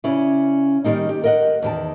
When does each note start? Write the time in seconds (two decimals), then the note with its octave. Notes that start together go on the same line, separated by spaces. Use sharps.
0.04 C#3 C#4 E4 D5
0.84 D#3 F3 G3 A#3 D#4
1.09 G4
1.24 A#4 D#5 F#5
1.62 E2 D#3 A5